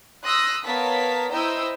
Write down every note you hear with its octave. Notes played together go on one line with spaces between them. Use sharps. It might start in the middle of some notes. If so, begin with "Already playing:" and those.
C6 D#6 E6 F#6 A#6
B3 A#4 C#5 F5 A5 B6
E4 C5 D#5 G5 A#5 E6